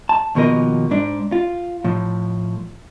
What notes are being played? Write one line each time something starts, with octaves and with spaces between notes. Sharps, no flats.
A5
D#2 B2 F3 A#4 D#5
G#2 D4
F4
A2 F3